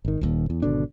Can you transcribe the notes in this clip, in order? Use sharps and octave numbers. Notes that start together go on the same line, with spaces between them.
G#1 D#3
D#1 A1 D#2
E2
G#1 B2 D3 D4